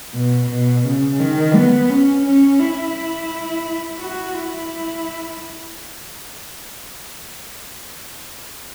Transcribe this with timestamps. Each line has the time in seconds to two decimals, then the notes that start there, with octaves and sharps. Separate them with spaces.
0.14 B2
0.50 B2
0.85 C#3
1.19 D#3
1.55 B3
1.90 C#4
2.25 C#4
2.60 E4
3.99 F#4
4.34 E4